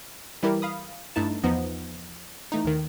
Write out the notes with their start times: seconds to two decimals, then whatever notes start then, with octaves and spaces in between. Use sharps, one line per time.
0.43 E3 G3 E4 G4 A#4
0.62 F5 B5 D#6
1.16 G2 A3 D#4 E4 A5
1.44 E2 F3 B3 D#4 D#5
2.52 E3 A3 D#4
2.64 D#2 D#3